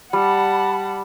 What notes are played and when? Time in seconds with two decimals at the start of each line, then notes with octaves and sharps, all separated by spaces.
0.13 G3 F#5 A5 B5